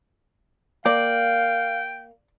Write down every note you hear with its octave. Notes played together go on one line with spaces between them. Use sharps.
A#3 D5 F5 G5